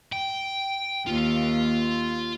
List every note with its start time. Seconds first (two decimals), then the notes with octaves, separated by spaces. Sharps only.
0.13 G5
1.07 D#2 F4